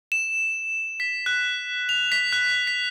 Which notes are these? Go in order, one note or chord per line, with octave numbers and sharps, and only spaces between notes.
E7
B6
F#6
F7
B6
F#6
B6